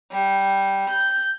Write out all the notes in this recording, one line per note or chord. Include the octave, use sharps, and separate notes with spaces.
G3
G6